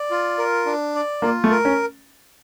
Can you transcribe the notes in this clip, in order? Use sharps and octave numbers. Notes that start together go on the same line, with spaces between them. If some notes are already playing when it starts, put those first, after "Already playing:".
Already playing: D5
F4
A#4
D4
D5
A#3 F4
A3
A#4
C#4